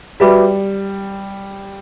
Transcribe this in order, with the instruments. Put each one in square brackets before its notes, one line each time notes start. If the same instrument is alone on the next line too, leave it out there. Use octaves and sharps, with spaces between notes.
[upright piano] G3 [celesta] F#4 B4 E5 B5 D6